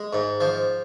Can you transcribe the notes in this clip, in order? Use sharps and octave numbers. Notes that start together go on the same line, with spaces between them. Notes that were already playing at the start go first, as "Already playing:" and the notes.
Already playing: G#3
G#2
F3